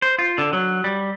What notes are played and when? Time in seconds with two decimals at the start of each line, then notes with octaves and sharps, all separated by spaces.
0.02 C5
0.19 F4
0.38 D3
0.53 F#3
0.84 G3